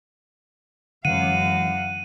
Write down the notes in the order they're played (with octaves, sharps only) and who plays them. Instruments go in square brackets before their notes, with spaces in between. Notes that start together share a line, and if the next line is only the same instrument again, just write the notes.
[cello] F#2 F5 [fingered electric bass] D3 E3 G#3 [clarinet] F#5 [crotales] D#7